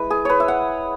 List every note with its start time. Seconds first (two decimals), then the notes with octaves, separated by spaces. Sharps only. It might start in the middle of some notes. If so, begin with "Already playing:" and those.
Already playing: G#3 E4 B4
0.10 G#4
0.25 B4 C#5
0.40 E5
0.48 F#5